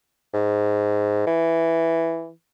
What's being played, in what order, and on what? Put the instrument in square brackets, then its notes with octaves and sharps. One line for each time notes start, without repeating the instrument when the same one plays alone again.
[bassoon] G#2
E3